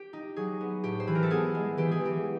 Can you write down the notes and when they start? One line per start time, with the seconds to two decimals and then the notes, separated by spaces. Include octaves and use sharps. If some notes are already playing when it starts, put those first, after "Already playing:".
Already playing: G4
0.13 D#4
0.36 F#3 G#4
0.61 B3
0.84 A2 G4
1.00 C5
1.07 E3 B4
1.15 A#4
1.23 A4
1.30 B3 G#4
1.55 G#3
1.77 E3 G4
1.91 G#4
2.01 E3 G4